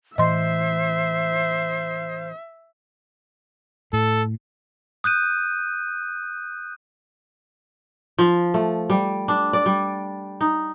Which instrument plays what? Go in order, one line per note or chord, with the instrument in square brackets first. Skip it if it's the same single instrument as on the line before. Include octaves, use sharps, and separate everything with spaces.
[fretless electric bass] A2 E3 [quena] C5 [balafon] D#5 C6 [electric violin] E5
[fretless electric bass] A2 [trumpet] A4
[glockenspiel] D#6 F#6 G6 D#7
[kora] F3
A3
G3
D4
D5
G3
D#4